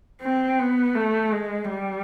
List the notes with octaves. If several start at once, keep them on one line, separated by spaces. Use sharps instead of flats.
C4
B3
A3
G#3
G3